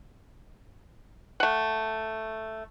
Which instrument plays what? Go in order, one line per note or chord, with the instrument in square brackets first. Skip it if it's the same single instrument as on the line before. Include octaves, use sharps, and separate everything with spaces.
[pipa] A3 F#5